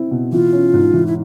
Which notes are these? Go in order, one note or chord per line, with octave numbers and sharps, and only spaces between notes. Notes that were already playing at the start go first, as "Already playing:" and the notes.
Already playing: C4 E4
B2
E3 F4
C#4
G#2
E3
E4